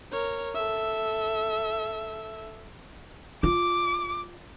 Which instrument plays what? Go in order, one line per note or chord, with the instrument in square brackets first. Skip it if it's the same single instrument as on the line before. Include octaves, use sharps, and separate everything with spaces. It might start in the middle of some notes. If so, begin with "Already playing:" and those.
[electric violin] A#4 C#5
A4 E5
[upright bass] F4 [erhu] D6